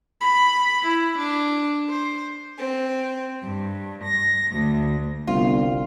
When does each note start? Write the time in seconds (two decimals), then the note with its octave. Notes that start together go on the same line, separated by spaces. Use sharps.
0.20 B5
0.85 E4
1.18 D4
1.89 C5
2.59 C4
3.43 G2
4.05 A#6
4.52 D2
5.27 G1 C2 F4